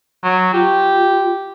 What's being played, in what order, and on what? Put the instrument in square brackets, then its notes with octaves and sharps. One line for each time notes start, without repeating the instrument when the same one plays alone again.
[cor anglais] F#3
[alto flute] F4 [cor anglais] G4